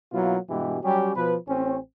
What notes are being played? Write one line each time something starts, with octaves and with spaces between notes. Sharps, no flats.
B2 F#3 A#3 E4 F4
G2 B2 E3 G#3 G4
F#3 G3 C#4 G4
B2 F3 B4
A1 C4 C#4